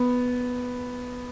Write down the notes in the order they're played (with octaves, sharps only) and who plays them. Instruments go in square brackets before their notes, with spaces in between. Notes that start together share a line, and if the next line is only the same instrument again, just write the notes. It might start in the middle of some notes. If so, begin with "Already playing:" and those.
Already playing: [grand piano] B3